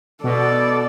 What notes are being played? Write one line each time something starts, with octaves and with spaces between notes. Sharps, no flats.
B2 A4 D5